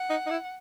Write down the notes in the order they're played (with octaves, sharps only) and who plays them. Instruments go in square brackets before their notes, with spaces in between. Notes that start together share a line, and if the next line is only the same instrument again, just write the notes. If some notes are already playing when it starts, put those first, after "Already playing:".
Already playing: [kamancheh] F#5
[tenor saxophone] D#4
D#4
E4